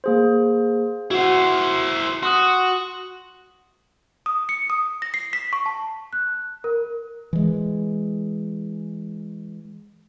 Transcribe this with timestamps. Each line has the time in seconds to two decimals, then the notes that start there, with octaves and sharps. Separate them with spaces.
0.04 A#3 G#4 C5
1.11 E4 F#4 C5 F#5
2.23 F#4 C6 D#6
4.26 D#6
4.49 C#7
4.70 D#6
5.02 A#6
5.14 C7
5.33 B6
5.53 C#6
5.66 A5
6.13 F#6
6.64 A#4
7.33 E3 G#3